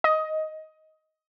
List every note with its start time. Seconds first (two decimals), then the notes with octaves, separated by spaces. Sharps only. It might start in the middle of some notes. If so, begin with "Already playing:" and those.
0.04 D#5